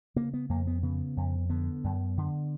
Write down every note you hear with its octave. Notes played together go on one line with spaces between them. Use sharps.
C#3 A#3
B3
F2 A#3
B3
C#3 B3
F2
D3 B3
F#2
D3